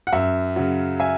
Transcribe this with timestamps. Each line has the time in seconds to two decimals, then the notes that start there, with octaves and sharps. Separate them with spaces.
0.07 F#5
0.13 F#2 E5
0.56 C#3 F#3
1.00 E5 G#5